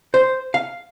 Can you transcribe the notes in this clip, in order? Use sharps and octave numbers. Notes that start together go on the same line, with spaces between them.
C5
F5